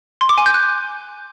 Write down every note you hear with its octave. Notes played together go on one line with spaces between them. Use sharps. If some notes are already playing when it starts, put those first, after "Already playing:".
C6
D6
G#5
G6
F#6